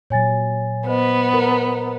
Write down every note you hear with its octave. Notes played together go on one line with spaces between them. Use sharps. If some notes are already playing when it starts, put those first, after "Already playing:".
A#2 F#3 C#5 G#5 A6
B3 C5 D#5
A#4